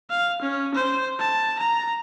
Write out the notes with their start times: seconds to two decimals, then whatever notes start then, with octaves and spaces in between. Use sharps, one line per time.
0.10 F5
0.42 C#4
0.75 C5
1.19 A5
1.59 A#5